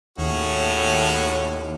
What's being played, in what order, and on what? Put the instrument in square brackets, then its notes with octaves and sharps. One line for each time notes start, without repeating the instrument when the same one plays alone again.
[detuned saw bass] D#2 [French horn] A2 [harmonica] C#4 F#4 G#4